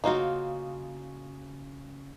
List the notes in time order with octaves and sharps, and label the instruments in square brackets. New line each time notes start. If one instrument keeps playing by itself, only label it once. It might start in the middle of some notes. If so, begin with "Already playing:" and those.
[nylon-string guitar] C#3 F#4 [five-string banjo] A#3 D#4 F4